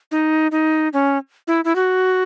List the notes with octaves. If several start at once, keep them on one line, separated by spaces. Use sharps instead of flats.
D#4
D#4
C#4
E4
E4
F#4